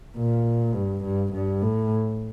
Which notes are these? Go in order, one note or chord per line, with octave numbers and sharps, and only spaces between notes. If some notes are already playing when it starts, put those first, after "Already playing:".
A#2
G2
G2
G2
A2